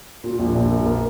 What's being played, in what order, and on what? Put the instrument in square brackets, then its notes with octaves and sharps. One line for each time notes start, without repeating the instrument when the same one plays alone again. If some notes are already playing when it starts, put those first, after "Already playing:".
[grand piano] A#2
A#1
A#1
A#3
A#3